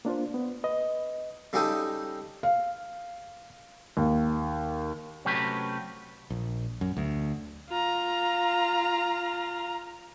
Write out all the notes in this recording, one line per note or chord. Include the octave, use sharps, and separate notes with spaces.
A#3 D4 F4 C5
B3
B4 D#5
C#3 G3 D#4 G4 A4 D#6
F5
D#2
C3 F#3 A3 C#4 G4 B4
A#1
F#2
D2
F4 A#5